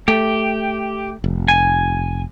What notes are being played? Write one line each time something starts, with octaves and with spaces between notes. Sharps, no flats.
A3 G4
F1
G#5